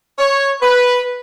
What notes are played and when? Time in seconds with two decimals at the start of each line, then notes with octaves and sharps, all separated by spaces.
0.19 C#5
0.62 B4